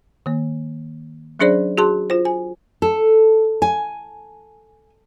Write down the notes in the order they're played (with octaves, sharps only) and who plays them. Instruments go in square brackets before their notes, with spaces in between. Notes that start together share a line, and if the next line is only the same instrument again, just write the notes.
[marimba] D#3 A#3
F#3 C#4 D4 G#4 C5 D5
F#4 G#4 A5 C6
F4 C5
G#5
[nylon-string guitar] A4
G#5